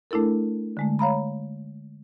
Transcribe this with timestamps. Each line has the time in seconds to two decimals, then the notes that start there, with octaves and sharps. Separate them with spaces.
0.11 A3 D4 E4 A4 A#4
0.77 D3 G#3 A3
0.99 C#5 F5 A#5 B5